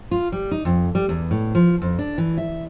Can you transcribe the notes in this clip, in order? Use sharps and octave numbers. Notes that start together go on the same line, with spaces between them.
F4
G3
D#4
F2
G3
E2
A2
F3
F2
D4
E3
E5